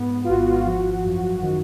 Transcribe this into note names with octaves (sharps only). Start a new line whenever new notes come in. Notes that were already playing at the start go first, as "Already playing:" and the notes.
Already playing: G#2 B3
B3
F4
G#1 F#4
F4
F3 F#4
F#2
D#3